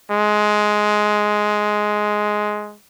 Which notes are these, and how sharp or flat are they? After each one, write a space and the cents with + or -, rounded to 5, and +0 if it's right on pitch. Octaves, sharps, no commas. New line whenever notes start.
G#3 +10